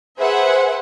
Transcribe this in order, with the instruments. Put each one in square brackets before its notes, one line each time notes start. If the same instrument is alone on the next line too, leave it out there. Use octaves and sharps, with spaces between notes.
[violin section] G#4 B4 C5 E5 F#5